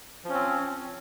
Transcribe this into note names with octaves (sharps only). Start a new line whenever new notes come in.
F3 C4 C#4